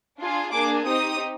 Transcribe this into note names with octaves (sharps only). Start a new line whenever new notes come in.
D4 F4 G#4
A#3 D4 G#4 D6
C4 D#4 G4 D#6